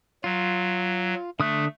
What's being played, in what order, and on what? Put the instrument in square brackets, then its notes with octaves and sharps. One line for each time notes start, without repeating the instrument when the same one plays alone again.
[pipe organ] F#3 [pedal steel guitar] F4
[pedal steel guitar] D3 D#6 F#6 [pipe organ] A3